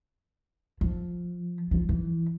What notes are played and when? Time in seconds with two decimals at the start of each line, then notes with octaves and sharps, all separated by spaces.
0.81 F3
1.71 F3
1.89 E3